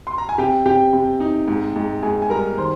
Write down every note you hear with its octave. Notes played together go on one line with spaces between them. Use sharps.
C6
A#5
G#5
C3 G4 G5
C3 G4 G5
C3
D#4
G#2
G#2
G#2 G#4 G#5
G#5
G3 A#4 A#5
D#3 C5 C6